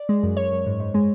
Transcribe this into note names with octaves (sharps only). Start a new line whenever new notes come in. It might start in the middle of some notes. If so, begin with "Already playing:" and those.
Already playing: D5
G#3
F#2
F#2 C#5
F#2
G#2
G#2
G#3